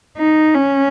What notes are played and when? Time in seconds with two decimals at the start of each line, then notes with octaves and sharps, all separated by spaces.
0.17 D#4
0.55 C#4